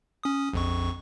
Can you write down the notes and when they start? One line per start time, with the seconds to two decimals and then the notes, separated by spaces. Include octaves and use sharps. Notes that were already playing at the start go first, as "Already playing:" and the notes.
0.23 C#4 D#6
0.53 A#1 F2 C#6